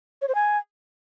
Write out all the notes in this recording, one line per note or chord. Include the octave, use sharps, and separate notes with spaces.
C#5
C5
G#5